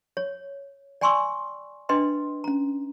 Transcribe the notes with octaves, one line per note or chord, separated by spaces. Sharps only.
C#5
D5 G5 G#5 C6 C#6 E6
D4 B4 D#5 G5 C6
C#4 A#5